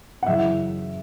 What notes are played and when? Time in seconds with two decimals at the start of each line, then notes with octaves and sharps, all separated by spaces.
0.23 F#5
0.26 F#2 C#3 E3 E5